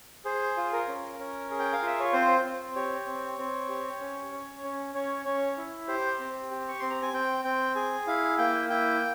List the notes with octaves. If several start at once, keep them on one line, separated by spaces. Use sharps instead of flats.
G#4 C5
F4
A#4
C#4
C#4
G#4
G5
F5
F4 E5
C#5
C4 C5
C4
G4 C#5
C4
C4
G4
C#4
C#4
C#4
C#4 C#5
C#4 C#5
E4
G4 C5
C4
G4
C#6
C4 C6
A#5
G#5
C4 G5
C4 G5
G#4 G#5
E4 F5
A#3 G5
E4 G5